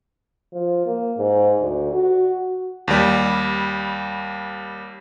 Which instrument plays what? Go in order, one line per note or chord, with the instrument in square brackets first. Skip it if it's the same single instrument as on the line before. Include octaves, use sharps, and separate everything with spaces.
[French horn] F3
A#3
G#2
D2
F#4
[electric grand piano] D#2 G3